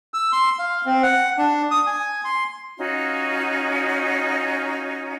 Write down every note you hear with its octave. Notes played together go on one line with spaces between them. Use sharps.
E6
C6
F5
C4
F#5
D4
D#6
G#5
C6
C#4 D#4 F4 F#4